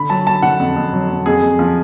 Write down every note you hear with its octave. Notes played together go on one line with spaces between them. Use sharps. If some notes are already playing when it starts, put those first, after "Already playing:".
Already playing: D3 B5
F#3 A5
F#3 A5
D3 F#5
F2
F2
F#3
F2
F2 G#4
F2
F3